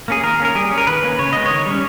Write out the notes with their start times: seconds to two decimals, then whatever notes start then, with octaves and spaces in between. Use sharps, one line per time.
0.08 A#3 C#4 G#4
0.23 D#3 A#4
0.40 A#3 C#4 A#4
0.55 G3 G#4
0.71 C#4
0.78 A#4
0.87 D#3 B4
1.03 A#3 C#4
1.19 C#3 C#5
1.33 G#3 B3 D#5
1.46 D#3 C#5
1.66 G3 C#4